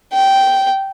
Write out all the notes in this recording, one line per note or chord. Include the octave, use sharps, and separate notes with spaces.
G5